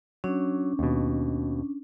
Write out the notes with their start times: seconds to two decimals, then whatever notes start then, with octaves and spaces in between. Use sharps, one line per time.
0.24 F#3 C#4 D4
0.79 D#2 B2